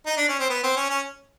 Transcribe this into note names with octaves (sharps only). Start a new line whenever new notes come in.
D#4
D4
C#4
C4
B3
C4
C#4
C#4